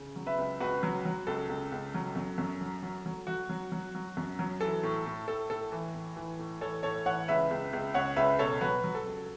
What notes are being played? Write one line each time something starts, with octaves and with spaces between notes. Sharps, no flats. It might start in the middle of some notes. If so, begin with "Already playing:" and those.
Already playing: C#3
F#3
B4 E5
C#2
C#2 F#4 B4
F#3
F#3
C#2 A4
C#2
C#2
F#3
F#2
F#2
F#3
F#3
F#3
F#3 F#4
F#3
F#3
F#3
F#2
F#3
E3 A4
A2
A2
A2 A4
A2 A4
E3
A2
E3
A2
E3 A4 C#5
A2 A4 C#5
E3 C#5 F#5
C#2 B4 E5
C#2
C#2
C#2 C#5 F#5
C#2 B4 E5
B2 A4 C#5
F#3 F#4 B4
F#3
A4
C#2